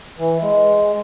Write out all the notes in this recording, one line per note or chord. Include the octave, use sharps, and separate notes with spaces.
E3
G#3